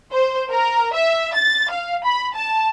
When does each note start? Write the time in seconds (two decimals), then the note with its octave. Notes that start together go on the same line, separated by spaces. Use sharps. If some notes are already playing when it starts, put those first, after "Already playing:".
0.12 C5
0.50 A#4
0.94 E5
1.34 A6
1.70 F5
2.04 B5
2.34 A5